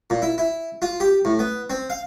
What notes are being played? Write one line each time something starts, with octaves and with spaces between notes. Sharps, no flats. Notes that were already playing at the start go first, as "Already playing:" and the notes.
A#2
E4
E4
F4
G4
A2
B3
C4
F5